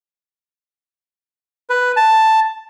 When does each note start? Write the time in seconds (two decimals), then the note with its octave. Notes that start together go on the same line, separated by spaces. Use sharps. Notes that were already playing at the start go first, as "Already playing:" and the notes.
1.70 B4
1.97 A5